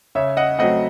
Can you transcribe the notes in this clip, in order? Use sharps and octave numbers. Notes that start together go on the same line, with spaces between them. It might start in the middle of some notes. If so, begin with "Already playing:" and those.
C#3 C#5 E5
D#5 F#5
F#3 A3 C4 D#5 F#5